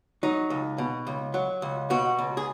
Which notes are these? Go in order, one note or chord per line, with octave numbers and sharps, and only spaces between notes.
F#3 D#4
C#2
B2
C#2
F#3
C#2
B2 F#4
C#2
G#4